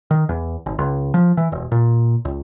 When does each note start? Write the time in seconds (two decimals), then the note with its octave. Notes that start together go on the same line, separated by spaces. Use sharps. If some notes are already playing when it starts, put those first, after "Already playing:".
0.11 D#3
0.29 E2
0.66 G#1
0.79 C#2
1.14 F3
1.37 E3
1.52 E1
1.72 A#2
2.25 C#2